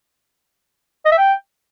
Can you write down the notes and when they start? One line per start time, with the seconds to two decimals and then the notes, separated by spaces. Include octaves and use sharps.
1.06 D#5
1.12 E5
1.18 G5